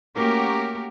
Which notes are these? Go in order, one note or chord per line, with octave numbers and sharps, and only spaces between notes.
A3 A#3 C#4 F#4 G4 A#4